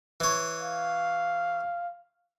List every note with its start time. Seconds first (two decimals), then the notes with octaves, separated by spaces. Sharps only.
0.20 E3 C#5
0.61 F5